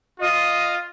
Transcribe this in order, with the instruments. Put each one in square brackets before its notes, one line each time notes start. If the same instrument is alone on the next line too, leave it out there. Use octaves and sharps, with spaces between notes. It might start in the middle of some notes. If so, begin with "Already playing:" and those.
[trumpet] F4 [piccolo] D#5